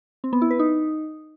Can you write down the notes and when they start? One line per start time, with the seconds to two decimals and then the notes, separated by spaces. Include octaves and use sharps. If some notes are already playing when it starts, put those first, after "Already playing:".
0.24 C4
0.33 B3
0.42 E4
0.50 B4
0.59 D#4